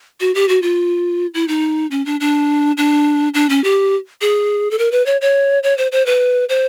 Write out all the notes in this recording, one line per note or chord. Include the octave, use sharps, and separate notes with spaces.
F#4
G4
F#4
F4
E4
D#4
C#4
D4
D4
D4
D4
C#4
G4
G#4
A4
A#4
B4
C#5
C#5
C#5
C5
C5
B4
C5